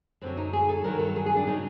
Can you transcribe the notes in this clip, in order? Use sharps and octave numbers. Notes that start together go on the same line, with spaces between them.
F#2 D3 F#3 C4
D#4
G#4
A4
G2 D#3 F#3 A#4
A4
G#4
G#4
D4
C#3 F#3 D#4